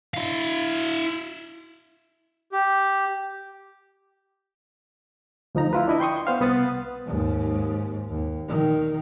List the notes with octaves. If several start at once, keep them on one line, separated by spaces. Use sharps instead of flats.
E4 F5
G4
D2 F3 D#4 A#5
E4 F4 B4
D4 E4 D#5
G5 C6 C#6 D#6
B3 C5 F5
C2 B3 D#6 A6
D#2 G#2
D#2
D#3